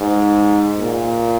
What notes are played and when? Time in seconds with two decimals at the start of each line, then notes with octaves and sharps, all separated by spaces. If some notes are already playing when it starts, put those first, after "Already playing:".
Already playing: G#2
0.79 A#2